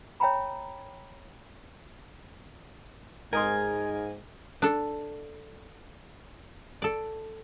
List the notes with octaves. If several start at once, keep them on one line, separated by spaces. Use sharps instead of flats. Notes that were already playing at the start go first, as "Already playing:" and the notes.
C#5 E5 G5 G#5 A#5 B5
G#2 A#4 D#5 G#5 C6
D4 A4
A4 D5